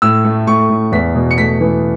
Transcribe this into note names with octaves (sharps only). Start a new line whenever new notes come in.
A2 E6
A3
A2 C#6
A2
E2 B6
B2
C#7
A3 B6
E3